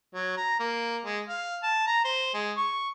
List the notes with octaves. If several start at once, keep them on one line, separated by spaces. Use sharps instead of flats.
F#3
A#5
A#3
G#3
F5
A5
A#5
C5
G#3
C#6